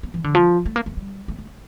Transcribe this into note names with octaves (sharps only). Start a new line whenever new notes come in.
A#3
E3
D3
F3
A3
A#3
A3
G3
A3
A3